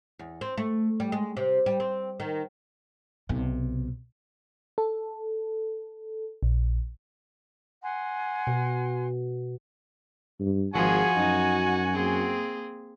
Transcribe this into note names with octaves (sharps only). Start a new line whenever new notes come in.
E2
C4
A3
G3
G#3
C3
G3
C4
D#3
B1 C3
A4
A#1
F#5 G#5 C6
B2
G2
G#1 F3 F#4 G#4 G#5
F#2 D#4
A#3 C4 G#4